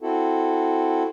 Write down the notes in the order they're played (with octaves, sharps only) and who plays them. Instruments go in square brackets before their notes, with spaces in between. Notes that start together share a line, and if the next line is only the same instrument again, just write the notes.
[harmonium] C4 E4 F#4 A4